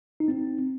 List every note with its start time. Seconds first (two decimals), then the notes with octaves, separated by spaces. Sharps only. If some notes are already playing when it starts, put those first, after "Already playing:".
0.20 D#4
0.28 C4